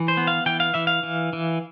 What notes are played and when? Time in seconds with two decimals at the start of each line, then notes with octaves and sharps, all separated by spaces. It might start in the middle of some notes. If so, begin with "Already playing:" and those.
Already playing: E3
0.08 C5
0.17 B3
0.27 F5
0.46 E3 G5
0.60 F5
0.74 E3 E5
0.87 F5
1.03 E3
1.33 E3